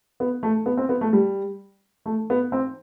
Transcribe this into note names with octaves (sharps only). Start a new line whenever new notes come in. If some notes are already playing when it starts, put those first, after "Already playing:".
B3
A3
B3
C4
B3
A3
G3
A3
B3
C4